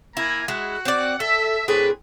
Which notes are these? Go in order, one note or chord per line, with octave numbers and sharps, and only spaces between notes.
A#3 E4 G#5 A#5
G#3 E4 F#4 F#5
C4 D5
A4 E5
A2 C4 D4 G#4 B4